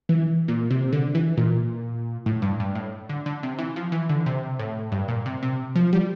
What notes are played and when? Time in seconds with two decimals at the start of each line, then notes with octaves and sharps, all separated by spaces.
0.09 E3
0.48 A#2
0.71 C3
0.93 D3
1.15 E3
1.37 A#2
2.26 A2
2.42 G2
2.60 G2
2.75 A2
3.09 D3
3.26 D3
3.43 C3
3.59 E3
3.76 F3
3.92 E3
4.09 D3
4.26 C3
4.59 A2
4.92 G2
5.08 A#2
5.26 C3
5.43 C3
5.75 F3
5.93 G3